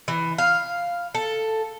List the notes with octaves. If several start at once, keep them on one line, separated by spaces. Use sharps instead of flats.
E3
F5
A4